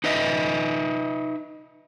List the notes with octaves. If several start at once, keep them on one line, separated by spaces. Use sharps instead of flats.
D#4 B4 D#5 E5